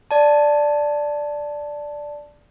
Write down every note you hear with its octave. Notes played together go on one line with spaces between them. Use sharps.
D5 A5